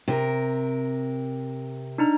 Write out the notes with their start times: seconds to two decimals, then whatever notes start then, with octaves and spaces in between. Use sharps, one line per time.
0.08 C3 A#4
1.98 D4 D#4 A#5